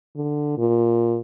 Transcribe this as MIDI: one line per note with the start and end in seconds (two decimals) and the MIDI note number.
0.16 0.56 50
0.58 1.20 46